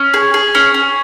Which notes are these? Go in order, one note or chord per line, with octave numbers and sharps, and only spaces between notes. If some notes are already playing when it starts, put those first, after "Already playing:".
Already playing: C#4
G#4
G#4
C#4
C#4